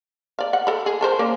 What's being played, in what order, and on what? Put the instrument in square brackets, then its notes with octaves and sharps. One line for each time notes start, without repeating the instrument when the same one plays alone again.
[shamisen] D5 F5
F#5
A4 B5
G#4
A4 A#4 C5
A#3 C#4 D5